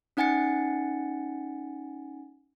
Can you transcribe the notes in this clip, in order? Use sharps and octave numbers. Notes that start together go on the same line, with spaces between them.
C#4 D#4 F#5 G#5 A6 C#7